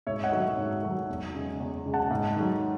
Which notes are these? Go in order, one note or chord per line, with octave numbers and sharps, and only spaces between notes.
G#2 C#5 E5
D#5 F#5
D#3 F#3 A3
C#5 E5
G#2
D#3 F#3 A3
E2
C#3 G#3
E2
C#3 G#3
F#5 A5
G#2
D#3 F#3 A3